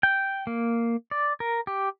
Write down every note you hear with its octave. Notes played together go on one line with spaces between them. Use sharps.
G5
A#3
D5
A#4
G4